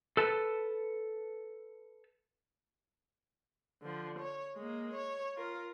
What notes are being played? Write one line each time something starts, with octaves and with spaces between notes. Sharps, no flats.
A4 B4 A5
D3 F3
C#5
G#3 A#3
C#5
F4 A#4